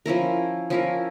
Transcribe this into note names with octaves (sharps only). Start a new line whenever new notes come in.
F3 C#4 E4 A#4
F3 C#4 E4 A#4